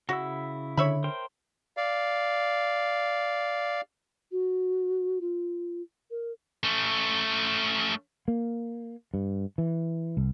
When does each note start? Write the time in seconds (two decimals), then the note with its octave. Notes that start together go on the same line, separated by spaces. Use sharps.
0.09 C#3 E4 F#4 E6
0.77 D3 C#5 E5 B5
1.04 A#4 C5 G5
1.77 D5 F5
4.31 F#4
5.21 F4
6.10 A#4
6.64 A3 C#4
8.28 A#3
9.14 G2
9.58 E3
10.17 C2